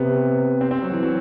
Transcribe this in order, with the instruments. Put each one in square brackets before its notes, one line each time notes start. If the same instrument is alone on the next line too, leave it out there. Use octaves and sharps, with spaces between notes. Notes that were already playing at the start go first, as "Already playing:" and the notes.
Already playing: [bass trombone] C3 [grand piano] B3
[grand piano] C4
C4
F#3
E3
F#3